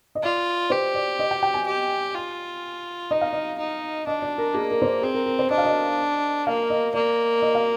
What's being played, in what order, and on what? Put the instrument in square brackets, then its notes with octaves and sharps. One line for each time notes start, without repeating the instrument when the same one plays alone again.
[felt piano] D#5
[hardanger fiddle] F4 [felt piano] D5
[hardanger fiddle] G4 [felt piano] C5
[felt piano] D5
D#5
G5
G5
G#5
[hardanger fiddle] G4
F4
[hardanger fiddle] D#4 [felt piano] D#5
[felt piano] F5
D#5
[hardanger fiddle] D#4
[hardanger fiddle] D4 [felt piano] D#5
[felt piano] D5
A#4
[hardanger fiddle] A#3 [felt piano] G#4
[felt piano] A#4
C5
D5
[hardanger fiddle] C4 [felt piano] G#4
[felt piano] A#4
A#4
C5
[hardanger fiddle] D4 [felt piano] D#5
[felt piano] F5
D#5
[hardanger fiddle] A#3 [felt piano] F5
[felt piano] D#5
[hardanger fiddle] A#3 [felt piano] D5
[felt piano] D#5
F5